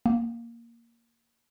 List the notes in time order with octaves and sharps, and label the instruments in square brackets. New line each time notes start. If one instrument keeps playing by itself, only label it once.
[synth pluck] A#3